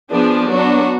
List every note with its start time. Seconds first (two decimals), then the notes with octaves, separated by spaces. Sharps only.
0.11 F3 B3 D4 G#4
0.48 F#3 B3 D4 F#4